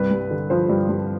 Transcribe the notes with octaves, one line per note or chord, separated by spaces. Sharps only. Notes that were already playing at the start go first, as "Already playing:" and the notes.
Already playing: C2 G2 B4
G2
D3
F3 C5
G2
G2